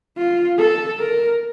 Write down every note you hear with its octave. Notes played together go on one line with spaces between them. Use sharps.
F4
A4
A#4